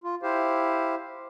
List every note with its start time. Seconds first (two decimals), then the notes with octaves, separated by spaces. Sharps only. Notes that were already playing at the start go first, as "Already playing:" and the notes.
0.04 F4
0.23 E4 G4 C5 F5